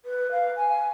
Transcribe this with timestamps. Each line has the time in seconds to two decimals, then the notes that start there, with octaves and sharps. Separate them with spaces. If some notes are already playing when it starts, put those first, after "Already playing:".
0.05 B4
0.32 F5
0.56 G#5